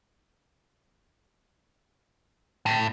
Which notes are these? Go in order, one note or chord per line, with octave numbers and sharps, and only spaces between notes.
A2